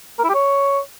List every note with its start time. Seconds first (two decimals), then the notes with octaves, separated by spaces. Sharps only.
0.19 A#4
0.24 E4
0.29 G4
0.34 C#5